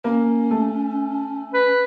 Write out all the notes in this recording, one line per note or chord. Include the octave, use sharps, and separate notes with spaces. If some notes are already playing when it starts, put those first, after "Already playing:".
A#3 C#4
A3
B4